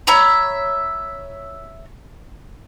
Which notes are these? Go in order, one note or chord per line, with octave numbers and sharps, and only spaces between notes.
C#5 E5 A#5 B5